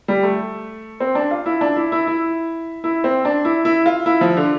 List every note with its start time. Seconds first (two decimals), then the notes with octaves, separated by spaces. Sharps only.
0.08 G3
0.23 A3
1.00 C4
1.15 D4
1.31 F4
1.46 E4
1.61 D4
1.76 E4
1.92 E4
2.07 E4
2.84 E4
3.04 C4
3.25 D4
3.45 E4
3.65 E4
3.86 F4
4.06 E4
4.21 F3
4.37 D3